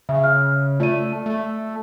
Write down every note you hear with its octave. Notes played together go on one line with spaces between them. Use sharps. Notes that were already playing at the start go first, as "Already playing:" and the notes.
C#3 E5
F6
A3 F4 D5 D#7
A3